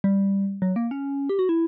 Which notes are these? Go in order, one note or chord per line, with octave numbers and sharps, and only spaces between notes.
G3
F#3
A#3
C#4
G4
F#4
E4